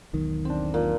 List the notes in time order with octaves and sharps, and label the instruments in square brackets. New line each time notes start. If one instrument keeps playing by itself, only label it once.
[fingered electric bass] E1 B1 D#3
[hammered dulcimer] C4 D4
A#2